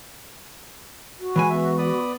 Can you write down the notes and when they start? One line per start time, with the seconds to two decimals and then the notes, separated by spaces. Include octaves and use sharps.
1.19 F#4
1.36 E3 G#3 B4 G#5
1.50 B3 E5
1.78 D5 B5 D#6